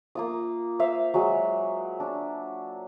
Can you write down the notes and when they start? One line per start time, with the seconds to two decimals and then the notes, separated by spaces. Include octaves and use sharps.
0.15 A#3 F4 D#6
0.79 C5 E5 F5
1.14 F#3 G#3 E5
2.00 D4